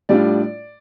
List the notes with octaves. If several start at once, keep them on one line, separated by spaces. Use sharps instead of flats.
A2 G3 D4 F4 D5